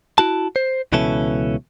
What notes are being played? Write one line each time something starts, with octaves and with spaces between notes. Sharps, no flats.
E4 F#4 A5
C5
C#2 B2 E3 C#4 A4 E5